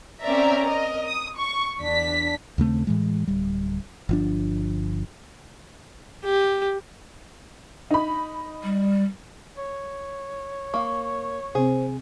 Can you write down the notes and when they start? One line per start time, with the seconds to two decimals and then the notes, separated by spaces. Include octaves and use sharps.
0.23 C4 C#4 A#4 D5 E5 A#5
0.66 A#4 D#5
1.06 D#6
1.37 C#6
1.79 E2 D4 B6
2.58 D#2 C#3 A3 C4
2.87 A2 E3 G#3
3.27 D1 G3
4.09 G1 F3 D4
6.25 G4
7.91 D#4 B5
8.63 G3
9.57 C#5
10.74 A#3 F5 C#6
11.55 C3 C4 G#4 C5